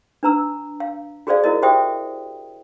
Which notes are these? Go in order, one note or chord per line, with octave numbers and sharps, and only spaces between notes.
D4 B4 A#5 E6
F5
F#4 G#4 A4 C5 D5 F5
E4 F#4 A#4 D#5
F#4 G4 C5 E5 G5 D#6